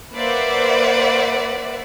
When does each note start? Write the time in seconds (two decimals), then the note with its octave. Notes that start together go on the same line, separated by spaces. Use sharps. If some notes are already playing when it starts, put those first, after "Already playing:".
0.15 A#3 B4 C5 D5 E5 F#5